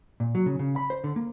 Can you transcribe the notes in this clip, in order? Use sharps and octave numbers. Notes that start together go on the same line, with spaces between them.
A#2
F#3
C#3
C#3
B5
C5
D3
A#3